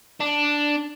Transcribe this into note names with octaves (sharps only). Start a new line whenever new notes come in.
D4